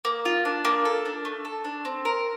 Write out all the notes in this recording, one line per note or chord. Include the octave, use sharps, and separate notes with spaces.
A#3
F4
D4
A#3
A4
D4
A3
A4
D4
C4
A#4